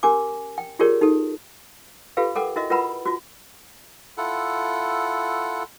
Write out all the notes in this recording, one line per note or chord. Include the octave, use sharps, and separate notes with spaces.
C#4 G4 A#4 G#5 D6
G5
F4 G4 G#4 A#4 C#5 D5
D#4 G4 A4
F4 G4 A4 B4 F5
A4 A#4 F#5 G5 D6
E4 F#4 A#4 D#5 E5
F4 A#4 B4 F#5 A#5 B5
F4 F#4
E4 F4 A4 F#5